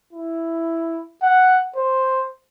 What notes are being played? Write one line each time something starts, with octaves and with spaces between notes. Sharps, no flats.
E4
F#5
C5